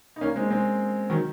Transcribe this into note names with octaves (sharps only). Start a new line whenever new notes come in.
D#4
A#3 C#4
G#3 C4
G#3 C4
D#3 F#3